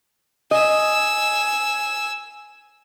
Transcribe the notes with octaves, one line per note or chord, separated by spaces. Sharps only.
D#5 G#5 E6